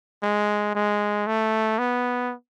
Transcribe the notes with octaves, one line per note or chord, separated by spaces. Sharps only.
G#3
G#3
A3
B3